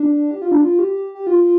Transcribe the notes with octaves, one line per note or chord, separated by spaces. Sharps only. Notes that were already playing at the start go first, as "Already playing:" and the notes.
Already playing: D4
G4
F4
D4
F4
G4
G4
F4